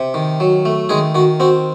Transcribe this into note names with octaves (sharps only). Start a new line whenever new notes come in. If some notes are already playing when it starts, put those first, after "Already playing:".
Already playing: C3
D#3
F#3
A3
D#3 G#3 G#4
D#3 F#4
C4 F#4